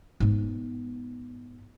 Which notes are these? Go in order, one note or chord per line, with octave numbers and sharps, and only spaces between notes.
G#2 B3